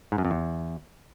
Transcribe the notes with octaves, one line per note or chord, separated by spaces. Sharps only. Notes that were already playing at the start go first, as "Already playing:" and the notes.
G#2
F#2
F2
E2